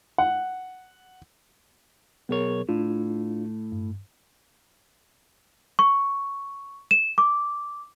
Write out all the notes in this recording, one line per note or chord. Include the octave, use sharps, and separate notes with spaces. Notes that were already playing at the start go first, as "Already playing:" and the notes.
F#5
B1 B3 G#4 A#4 C#5
A2 D4 F4
G2
C#6
E7
D6